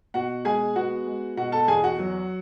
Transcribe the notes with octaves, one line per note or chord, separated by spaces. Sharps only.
B2 F#4 F#5
G#3 G#4 G#5
B3 F#4 F#5
G#3
B2 F#4 F#5
A4 A5
E2 G#4 G#5
F#4 F#5
F#3